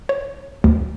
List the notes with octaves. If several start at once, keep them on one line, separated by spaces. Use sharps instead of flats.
C#5
D2